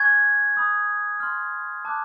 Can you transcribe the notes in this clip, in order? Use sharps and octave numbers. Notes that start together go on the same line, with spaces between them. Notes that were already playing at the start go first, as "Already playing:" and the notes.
Already playing: G#5 C#6 F#6 G#6
B5 D#6 G6
C6 F6
A5 D6 F#6